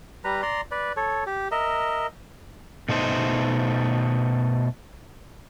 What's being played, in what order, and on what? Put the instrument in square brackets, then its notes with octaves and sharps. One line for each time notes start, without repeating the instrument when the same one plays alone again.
[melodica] G3 B4 A#5
D5 A#5 C6
B4 D5
A4 C#5
G4
A#4 D#5 E5
[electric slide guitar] B2 A3 D#4 C5